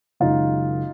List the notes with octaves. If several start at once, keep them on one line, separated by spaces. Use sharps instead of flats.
F#1 F#2 D#3 G#3 D#4 F4